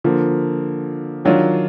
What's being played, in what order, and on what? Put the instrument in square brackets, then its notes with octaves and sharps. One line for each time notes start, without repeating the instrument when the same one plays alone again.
[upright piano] D3 F3 A#3
D#3 F#3 D4 F4